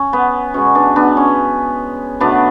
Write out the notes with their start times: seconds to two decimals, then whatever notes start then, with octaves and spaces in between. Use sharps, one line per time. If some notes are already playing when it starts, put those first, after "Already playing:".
Already playing: C#4
0.13 B3
0.54 B2 G#3 C#4
0.75 B3 D4
0.96 B3 D4
1.17 C#4
2.20 B2 F#3 A3 B3 D4